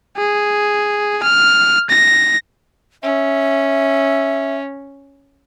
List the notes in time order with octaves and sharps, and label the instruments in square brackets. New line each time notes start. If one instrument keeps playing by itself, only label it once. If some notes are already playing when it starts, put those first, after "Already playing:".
[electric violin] G#4
F6
A#6
[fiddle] C#4 [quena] E5